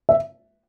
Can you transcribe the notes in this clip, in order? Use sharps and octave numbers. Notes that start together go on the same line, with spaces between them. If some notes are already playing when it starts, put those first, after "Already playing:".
E5